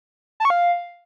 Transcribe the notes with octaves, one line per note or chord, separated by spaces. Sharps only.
A5
C#6
F5